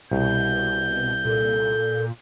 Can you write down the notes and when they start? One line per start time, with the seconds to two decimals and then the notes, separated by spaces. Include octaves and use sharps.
0.11 C2 B2 G6
1.25 A#2 A4